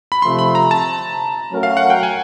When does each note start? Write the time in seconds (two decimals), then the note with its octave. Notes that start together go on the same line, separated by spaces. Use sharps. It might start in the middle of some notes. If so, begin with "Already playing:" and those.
0.12 B5
0.22 C3 F3 A3 C6
0.39 B5
0.55 A#5
0.71 A5
1.52 F#3 A3 C#4 F#4 A#4
1.63 F5
1.77 F#5
1.90 G5
2.03 G#5